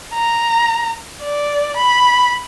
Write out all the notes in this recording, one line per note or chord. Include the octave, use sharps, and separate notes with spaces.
A#5
D5
B5